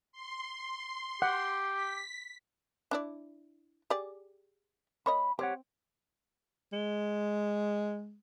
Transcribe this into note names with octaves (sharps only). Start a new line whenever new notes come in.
C6
G4 F#5
B6
D4 E4 D5
G4 G#4 D5
A#3 C#5 D#5 B5
C4 G4 C#5 F#5
G#3